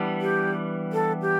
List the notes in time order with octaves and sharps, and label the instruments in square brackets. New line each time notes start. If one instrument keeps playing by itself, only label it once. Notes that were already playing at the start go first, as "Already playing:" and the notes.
Already playing: [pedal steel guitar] E3 G3 B3 D4
[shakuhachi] G4
A4
G4